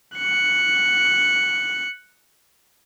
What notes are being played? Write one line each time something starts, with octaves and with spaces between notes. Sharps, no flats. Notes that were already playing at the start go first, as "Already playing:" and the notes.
F#6 C#7